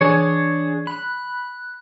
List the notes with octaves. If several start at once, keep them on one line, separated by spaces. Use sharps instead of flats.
E3 D4 G#4 C#5
B5 F#6